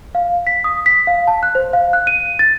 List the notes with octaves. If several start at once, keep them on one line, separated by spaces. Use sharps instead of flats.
F5
B6
D#6
B6
F5
A5
F#6
C5
F5
F#6
D#7
A6